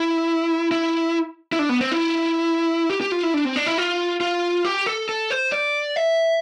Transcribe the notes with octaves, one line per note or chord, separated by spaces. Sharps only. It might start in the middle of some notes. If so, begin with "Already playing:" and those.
Already playing: E4
E4
E4
D4
B3
C4
E4
G4
G4
F4
E4
D4
C4
D4
E4
F4
F4
G4
A4
A4
C5
D5
E5